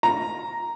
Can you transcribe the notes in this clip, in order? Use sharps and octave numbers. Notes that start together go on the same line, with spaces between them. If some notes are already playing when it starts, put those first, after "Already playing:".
A#5